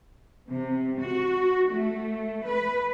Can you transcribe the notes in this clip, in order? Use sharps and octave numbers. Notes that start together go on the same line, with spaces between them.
C3
F#4
A3
B4